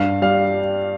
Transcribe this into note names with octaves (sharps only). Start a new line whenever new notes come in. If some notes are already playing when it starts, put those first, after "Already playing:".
Already playing: G2 F5
G3 F5